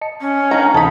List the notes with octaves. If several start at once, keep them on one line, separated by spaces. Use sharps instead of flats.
D#5 A5 C#7
C#4
D#3 D4 D#4 F5 G#5 A#5
D2 C3 E3 D#4 A4 B5